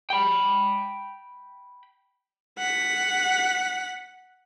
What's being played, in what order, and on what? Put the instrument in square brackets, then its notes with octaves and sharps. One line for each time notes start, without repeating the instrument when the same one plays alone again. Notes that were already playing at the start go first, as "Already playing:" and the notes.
[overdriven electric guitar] G5 B5
[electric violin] F#5 B6